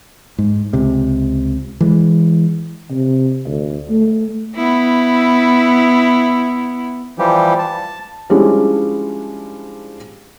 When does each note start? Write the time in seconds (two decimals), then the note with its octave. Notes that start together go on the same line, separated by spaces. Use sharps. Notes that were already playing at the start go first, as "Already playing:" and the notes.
0.38 G#2
0.73 C#2 C3
1.81 E3 G#3
2.91 C3
3.46 D2
3.90 A3
4.56 B3 E4
7.19 E3 F3 G3 G4
7.59 A5
8.30 F3 G3 G#3 C#4 D4 E4